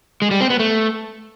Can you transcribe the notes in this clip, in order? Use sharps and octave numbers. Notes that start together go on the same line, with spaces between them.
G#3
G3
C4
B3
A3